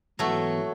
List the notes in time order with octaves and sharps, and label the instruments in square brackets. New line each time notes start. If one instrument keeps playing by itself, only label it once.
[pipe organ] G#2 E3 B3 F#4 [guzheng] F#3 A3